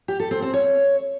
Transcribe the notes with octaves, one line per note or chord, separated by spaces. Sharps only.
G4
A4
C4
C4
C#5